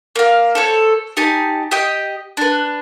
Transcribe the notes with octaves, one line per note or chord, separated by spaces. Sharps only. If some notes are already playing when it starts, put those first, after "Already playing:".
A#3 F5
A4 C5 C#5
D#4 G4 G#5 A5
G4 D#5 G5
D4 B4